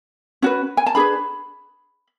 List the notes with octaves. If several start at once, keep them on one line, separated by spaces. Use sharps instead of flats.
C#4 F#4 B4
G#5
A5
D4 G#4 B4 B5